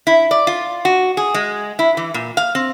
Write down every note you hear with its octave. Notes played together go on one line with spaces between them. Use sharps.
E4
D5
F4
F#4
G#4
G#3
E4
E3
A#2
F5
C4